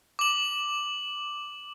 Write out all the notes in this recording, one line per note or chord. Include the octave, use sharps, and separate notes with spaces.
D6 F#7